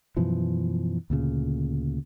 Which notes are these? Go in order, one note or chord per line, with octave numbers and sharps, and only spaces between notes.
F#2 B2 E3 F3
D2 A#2 C#3